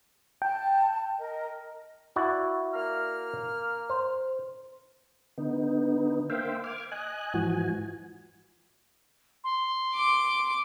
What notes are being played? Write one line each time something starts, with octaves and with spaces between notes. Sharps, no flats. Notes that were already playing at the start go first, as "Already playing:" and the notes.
G5 A5
A#4 D#5
E4 F#4 D5
A#3 A#5 F6
C5
D3 B3 D#4
A#3 C5 E5 F5 G5
D6 F6 G#6
D#5 G#5 F#6
G#2 E3 F3 F#4 G#5
C6
D6